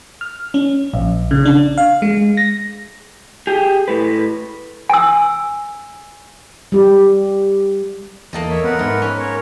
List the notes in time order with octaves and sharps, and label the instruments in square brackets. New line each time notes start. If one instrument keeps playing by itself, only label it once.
[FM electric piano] F6
C#4
A#1
C#3
D4
F5
G#3
A#6
[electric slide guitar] G4 G#4
A2 B4
[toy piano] G#5 E6
[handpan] G3 G4
[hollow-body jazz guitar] E2 [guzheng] A#3 A4 D#5
[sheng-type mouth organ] C#5 E5
[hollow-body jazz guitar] B3 [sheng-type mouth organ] A#4 B4 F#5
[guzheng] G#2 [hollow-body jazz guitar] E5
[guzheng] C#4
[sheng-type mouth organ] A#4 C#5